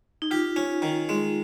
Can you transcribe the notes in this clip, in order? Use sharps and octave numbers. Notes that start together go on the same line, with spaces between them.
D#4
F4 G4
C#4
D#3
G#3